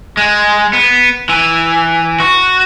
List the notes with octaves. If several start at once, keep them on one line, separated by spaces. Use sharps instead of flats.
G#3
B3
E3
F#4